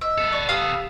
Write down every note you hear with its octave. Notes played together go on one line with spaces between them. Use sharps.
D#5 E5
B3 A4
D5 C#6
G4 F5 D#6 E6